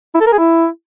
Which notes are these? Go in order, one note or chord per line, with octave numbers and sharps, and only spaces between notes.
E4
A4
A#4
G#4
E4